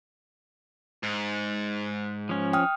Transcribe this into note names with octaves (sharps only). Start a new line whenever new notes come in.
G#2
F3 C#4
G5 D#6 F6